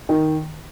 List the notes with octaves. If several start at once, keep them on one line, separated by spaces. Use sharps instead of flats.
D#3